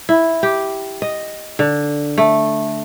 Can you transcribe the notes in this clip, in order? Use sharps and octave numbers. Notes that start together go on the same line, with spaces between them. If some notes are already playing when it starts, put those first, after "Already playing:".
E4
G4
D#5
D3
A3